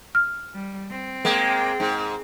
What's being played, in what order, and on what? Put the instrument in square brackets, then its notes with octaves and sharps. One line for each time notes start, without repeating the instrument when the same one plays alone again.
[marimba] F6
[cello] G3
C4
[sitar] G#3 A#3 [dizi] G5
[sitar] G#2